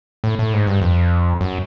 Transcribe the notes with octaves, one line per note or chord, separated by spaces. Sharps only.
A2
A2
G#2
G2
F2
F#2